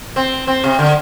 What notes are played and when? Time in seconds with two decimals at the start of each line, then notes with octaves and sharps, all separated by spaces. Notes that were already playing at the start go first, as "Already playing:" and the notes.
0.16 C4
0.47 C4
0.64 C3
0.79 D3